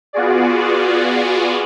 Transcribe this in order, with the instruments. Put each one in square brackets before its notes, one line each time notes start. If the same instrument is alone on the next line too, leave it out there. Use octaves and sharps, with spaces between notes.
[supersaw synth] B3 F4 F#4 G#4 D5